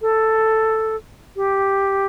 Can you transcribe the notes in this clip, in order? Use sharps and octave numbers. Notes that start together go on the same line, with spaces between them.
A4
G4